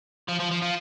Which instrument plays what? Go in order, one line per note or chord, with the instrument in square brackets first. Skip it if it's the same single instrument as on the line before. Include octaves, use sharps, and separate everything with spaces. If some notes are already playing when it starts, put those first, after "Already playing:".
[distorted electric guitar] F3
F3
F3
F3